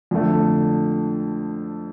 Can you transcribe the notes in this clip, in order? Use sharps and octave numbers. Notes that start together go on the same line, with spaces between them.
F2 D3 A3